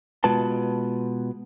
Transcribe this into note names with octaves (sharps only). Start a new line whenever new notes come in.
B2 G#3 F4 B4 A5